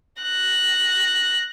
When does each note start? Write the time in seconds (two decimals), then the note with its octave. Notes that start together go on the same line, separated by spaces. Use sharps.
0.22 F#6 A#6